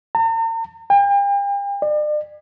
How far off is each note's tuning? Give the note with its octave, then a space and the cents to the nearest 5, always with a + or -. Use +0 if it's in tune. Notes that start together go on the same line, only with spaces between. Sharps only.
A#5 -45
G5 +40
D5 +40